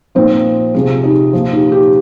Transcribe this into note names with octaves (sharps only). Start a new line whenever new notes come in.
A#2 F3 C4 D#4
C3 F3 F4 G#4
D#4 G4
A#2 F3
D#4 G4
D#4 G4